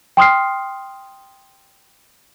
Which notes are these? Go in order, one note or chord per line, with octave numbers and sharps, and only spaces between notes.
G5 C6 D#6 F6 C7